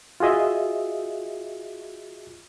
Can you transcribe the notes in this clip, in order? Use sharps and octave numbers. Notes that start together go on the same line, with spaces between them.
F4 F#4 G#4 D#5 E5